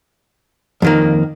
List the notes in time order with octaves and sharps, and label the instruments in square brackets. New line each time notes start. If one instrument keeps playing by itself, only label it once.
[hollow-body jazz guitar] F2 D#3 A#3